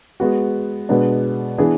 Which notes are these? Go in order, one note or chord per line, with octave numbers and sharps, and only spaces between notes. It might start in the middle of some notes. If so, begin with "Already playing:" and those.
G#3 B3 F#4
B2 G#3 B3 D4
E3 B3 D4 G#4